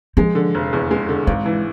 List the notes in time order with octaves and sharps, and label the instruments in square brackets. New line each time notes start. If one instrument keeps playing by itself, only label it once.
[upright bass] F3 [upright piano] G#3
[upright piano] D3
F1
E2
G#3
D3
[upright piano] G#1 [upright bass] G#3
[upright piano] E3